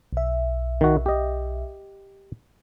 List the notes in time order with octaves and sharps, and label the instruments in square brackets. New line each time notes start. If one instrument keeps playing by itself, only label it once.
[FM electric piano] B1 E5
[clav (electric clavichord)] D#3 F#4
G4 D#5